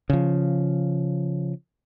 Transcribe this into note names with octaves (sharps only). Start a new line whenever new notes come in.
C#3 F3